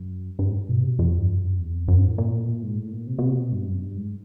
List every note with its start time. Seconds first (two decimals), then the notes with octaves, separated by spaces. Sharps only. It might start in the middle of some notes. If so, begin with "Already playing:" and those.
Already playing: F#2
0.39 G2
0.48 G#2
0.56 G2
0.69 B2
0.79 C3
0.89 B2
0.99 F2
1.18 G2
1.29 F#2
1.59 E2
1.74 F2
1.88 F#2
1.98 G2
2.08 A2
2.18 A#2
2.42 A2
2.47 A#2
2.63 G#2
2.78 A2
2.92 A#2
3.07 C3
3.19 B2
3.22 C3
3.37 B2
3.52 G2
3.67 F#2
3.82 G2
3.97 G#2